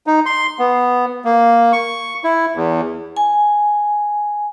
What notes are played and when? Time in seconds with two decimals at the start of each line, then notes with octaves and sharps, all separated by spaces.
0.07 D#4
0.26 C6
0.59 B3
1.25 A#3
1.73 C#6
2.24 E4
2.55 E2
3.17 G#5